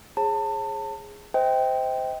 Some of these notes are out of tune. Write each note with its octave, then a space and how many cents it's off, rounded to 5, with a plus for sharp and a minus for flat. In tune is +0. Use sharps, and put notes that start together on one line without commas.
G#4 +0 C#5 -45 A5 +30
C5 -15 D#5 +30 G5 +0